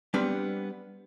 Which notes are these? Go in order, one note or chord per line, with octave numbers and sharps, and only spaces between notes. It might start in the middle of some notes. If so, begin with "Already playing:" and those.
G3 B3 C4 D4 G4